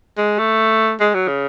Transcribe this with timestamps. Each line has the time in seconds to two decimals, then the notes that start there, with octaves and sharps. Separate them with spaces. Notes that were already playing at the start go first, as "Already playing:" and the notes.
0.18 G#3
0.39 A3
1.00 G#3
1.14 F#3
1.28 C#3